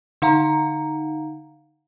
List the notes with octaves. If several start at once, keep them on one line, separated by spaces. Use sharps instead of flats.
D3 D#4 F5 F#5 A#5